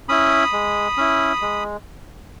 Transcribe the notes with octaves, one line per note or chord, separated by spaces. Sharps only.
C#4 E4 B5 D#6
G#3
C#4 E4
G#3